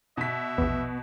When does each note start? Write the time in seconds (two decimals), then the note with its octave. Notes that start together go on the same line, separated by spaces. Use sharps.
0.17 B2 E5 B6
0.58 A#1 E2 B3